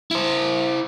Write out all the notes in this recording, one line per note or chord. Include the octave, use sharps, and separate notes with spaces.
E4 C5